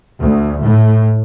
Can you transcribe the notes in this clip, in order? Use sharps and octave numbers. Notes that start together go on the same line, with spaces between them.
D2
A2